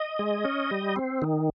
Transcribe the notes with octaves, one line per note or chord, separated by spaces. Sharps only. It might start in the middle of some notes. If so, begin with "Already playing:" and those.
Already playing: D#5
G#3
C#4
G3
C4
D#3